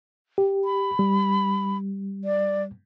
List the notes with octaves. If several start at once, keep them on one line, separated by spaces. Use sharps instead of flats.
G4
B5
G3
D5